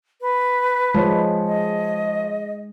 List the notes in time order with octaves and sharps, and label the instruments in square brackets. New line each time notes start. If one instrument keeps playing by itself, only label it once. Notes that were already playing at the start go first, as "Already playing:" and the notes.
[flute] B4
[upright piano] F3 C#5 [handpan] G#3
[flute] D#5